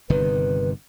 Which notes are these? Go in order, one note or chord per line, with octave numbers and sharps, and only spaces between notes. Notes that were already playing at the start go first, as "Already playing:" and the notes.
G1 C3 D#3 B4